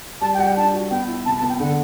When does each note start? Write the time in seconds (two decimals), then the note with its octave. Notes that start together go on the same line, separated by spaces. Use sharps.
0.21 G3 A5
0.34 G5
0.39 G3 F#5
0.46 G5
0.57 D4 A5
0.74 F#4
0.91 B3 G5
1.08 E4
1.26 C3 A5
1.38 A5
1.42 B3
1.49 G5
1.60 D3 F#5